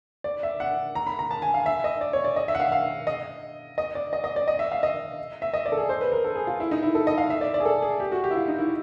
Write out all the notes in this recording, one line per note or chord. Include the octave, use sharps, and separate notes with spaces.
D5
E5
F#5
A#5
B5
A#5
A5
G#5
F5
E5
D#5
D5
C#5
D5
D#5
E5
F#5
F5
F5
D#5
D#5
D5
D#5
D#5
D5
D#5
E5
F5
D#5
E5
D#5
D5
A4
G#4
C5
B4
A#4
A4
G#4
F4
E4
D#4
E4
A4
D#5
F5
E5
D5
D5
G#4
A4
G#4
G4
F#4
G4
E4
F4
D#4
E4